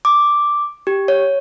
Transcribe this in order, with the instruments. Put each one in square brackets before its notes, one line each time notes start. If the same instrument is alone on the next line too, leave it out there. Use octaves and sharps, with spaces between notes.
[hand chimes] D6
G4
C#5